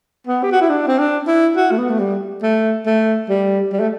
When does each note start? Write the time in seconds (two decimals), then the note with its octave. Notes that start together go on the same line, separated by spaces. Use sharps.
0.27 B3
0.43 G4
0.52 F#4
0.61 E4
0.70 D4
0.87 C4
0.99 D4
1.27 E4
1.56 F#4
1.71 A3
1.78 B3
1.90 A3
1.99 G3
2.43 A3
2.86 A3
3.29 G3
3.72 G3
3.80 A3